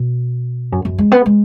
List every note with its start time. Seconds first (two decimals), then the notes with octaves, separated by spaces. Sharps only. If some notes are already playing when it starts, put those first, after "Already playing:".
Already playing: B2
0.72 F#2
0.85 F#2
0.98 G#3
1.12 B3
1.26 G#3